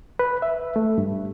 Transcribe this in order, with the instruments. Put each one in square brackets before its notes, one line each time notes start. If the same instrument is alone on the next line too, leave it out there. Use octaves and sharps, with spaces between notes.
[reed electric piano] B4
E5
A3
G2